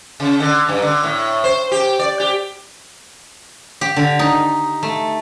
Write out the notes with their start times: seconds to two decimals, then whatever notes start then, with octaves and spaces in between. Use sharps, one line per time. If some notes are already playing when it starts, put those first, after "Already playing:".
0.20 C#3
0.40 D3
0.69 G2
0.82 D3
1.03 A2
1.44 C5
1.72 G4
1.99 D5
2.20 G4
3.81 G4
3.96 D3
4.19 D#4
4.83 A3